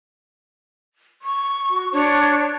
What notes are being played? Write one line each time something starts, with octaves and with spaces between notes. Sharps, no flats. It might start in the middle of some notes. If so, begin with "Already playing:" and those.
C#6
F#4
D4 C#5